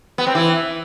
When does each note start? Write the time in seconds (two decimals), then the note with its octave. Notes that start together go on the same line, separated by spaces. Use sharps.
0.18 B3
0.27 C4
0.35 E3